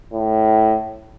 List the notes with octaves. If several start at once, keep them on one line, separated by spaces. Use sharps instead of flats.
A2